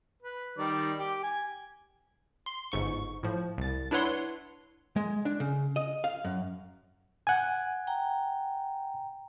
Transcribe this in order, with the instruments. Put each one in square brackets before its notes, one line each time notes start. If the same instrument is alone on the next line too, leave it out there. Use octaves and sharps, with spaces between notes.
[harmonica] B4
D#3 G3 D5
G4
G#5
[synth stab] C6
G1 G#2 C#6
A2 F3
C2 A6
D4 E4 B4 C#5 F#5 C6
[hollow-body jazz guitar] G#3
D4
C#3
D#5
F5
F#2
[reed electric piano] F#5 G#5
[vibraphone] G5 A#5